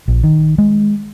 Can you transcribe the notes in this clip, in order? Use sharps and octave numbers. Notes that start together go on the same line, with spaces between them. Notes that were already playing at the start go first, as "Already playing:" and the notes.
A#1
D#3
G#3